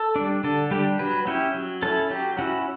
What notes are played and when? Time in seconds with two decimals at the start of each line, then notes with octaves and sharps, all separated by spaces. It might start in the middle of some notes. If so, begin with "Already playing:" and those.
Already playing: A4
0.16 G3 D4
0.44 D3 A4
0.71 G3 D4 G4
0.99 F#3 B4
1.27 C#4 E4 G4
1.54 F#3
1.82 C#4 E4 A4
2.11 F#3 G4
2.38 C#4 E4 F#4